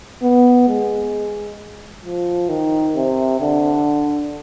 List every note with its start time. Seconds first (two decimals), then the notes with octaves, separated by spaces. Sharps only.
0.22 B3
0.68 G#3
2.05 F3
2.49 D#3
2.96 C3
3.41 D3